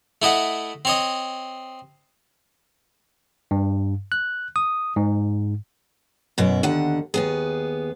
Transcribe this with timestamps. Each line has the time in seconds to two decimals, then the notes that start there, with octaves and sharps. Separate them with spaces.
0.22 A3 E4 D#5 F#5
0.85 C4 C#5 D#5
3.51 G2
4.12 F#6
4.56 D#6
4.96 G#2
6.38 F#2 B2 E4
6.63 D#2 D3 F#5
7.14 D#2 B3 G#4